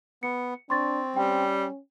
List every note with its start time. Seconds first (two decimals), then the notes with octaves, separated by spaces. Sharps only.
0.23 B3 C#7
0.70 C4 D4 C6 C#6 A6
1.16 G3 C#4 G5